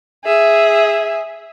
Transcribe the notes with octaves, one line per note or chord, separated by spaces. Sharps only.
G#4 E5